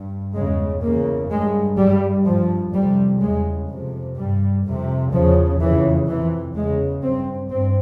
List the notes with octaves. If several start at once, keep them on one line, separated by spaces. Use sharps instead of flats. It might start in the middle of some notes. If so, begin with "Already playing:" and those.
Already playing: G2
E2 C#3 G#3
E2 C#3 A#3
G2 G#3
G2 G3
G2 F3
F2 C3 G3
E2 C#3 G#3
F2 C3
G2 G3
F2 C3
E2 C#3 F3
F2 C#3 E3
F2 C3 E3
E2 C#3 G#3
G2 C4
G2 C4